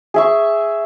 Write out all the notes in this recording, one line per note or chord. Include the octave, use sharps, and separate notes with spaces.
G#4 E5 C#6